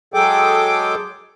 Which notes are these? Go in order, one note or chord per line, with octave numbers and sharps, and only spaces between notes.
F#3 G#3 G#4 A4 G5 D6